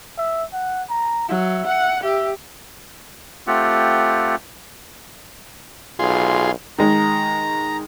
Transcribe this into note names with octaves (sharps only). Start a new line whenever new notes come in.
E5
F#5
A#5
F#3 E5
F#5
G4 E5
A3 C4 F4 G4 F#5
B1 F4 G#4 C6
D#3 G#3 A#5